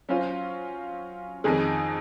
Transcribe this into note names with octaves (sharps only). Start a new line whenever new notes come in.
F#3 C#4 F4 C5
F2 D#3 G#3 D#4 G#4